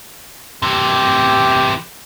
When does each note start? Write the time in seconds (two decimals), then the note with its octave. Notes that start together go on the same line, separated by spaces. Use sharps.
0.62 C3 E3 G4